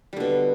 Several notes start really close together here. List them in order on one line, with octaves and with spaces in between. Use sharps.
G3 D3 B2